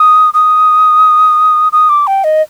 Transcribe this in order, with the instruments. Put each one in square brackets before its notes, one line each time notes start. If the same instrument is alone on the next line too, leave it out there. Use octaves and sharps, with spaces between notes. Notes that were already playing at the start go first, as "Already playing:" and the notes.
Already playing: [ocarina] D#6
D#6
D#6
D6
G5
D#5